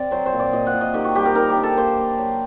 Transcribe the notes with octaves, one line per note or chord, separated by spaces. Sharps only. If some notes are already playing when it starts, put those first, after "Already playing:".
Already playing: C4 D5
F#3 C5
C5
A#2
D5
A#2 D#5
F#5
A#2
D#5
D#3 G4
F#4
G3 G4
A#4
D#3 A#4
G4
D4
A4
A#3 C5
A#3
F#3